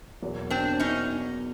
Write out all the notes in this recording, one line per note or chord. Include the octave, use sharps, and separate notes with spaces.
E2 B2 F#3 A#3
C4 D4
C#4 D#4